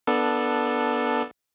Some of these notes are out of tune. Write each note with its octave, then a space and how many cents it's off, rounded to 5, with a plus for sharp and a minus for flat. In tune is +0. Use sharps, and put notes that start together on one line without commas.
B3 -15 D4 +5 A4 +0